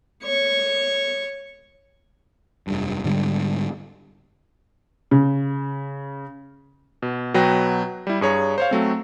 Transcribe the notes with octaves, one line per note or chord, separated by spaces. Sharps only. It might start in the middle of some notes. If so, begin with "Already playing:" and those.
C#5 C#6
F1 G2
G#2 D3 G3
C#3
B2
B2 F#3 B4 G5 A#6
G3 E4
G2 G#4 C#5 A#5
C5 C#5 F5
F#3 A3 C4